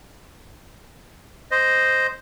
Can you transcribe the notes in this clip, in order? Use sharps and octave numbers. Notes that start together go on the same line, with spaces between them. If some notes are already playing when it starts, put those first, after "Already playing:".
C5 D#5